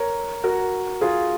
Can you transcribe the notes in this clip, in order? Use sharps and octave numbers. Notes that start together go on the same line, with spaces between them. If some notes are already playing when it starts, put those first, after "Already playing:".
Already playing: A#4 C#5
F#4 A#4
F4 G#4